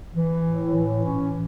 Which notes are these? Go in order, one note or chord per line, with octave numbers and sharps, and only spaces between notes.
E3
A2
E3
C#4